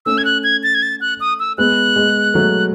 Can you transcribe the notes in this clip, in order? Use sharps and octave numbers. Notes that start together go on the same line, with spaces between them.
A3 C#4 E6
G#6
F#6
G#6
A6
G#6
A6
F#6
D#6
E6
G#3 B3 F#6
G#3
F#3 A3